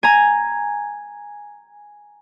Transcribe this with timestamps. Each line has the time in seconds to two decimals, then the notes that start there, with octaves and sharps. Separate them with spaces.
0.03 G#5 A#5